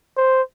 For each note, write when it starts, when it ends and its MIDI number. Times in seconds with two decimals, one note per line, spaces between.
0.17 0.42 72